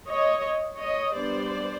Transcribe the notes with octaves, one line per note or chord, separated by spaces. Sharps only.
C#5 D#5
C#5 D#5
G3 B3 D4 C5 D5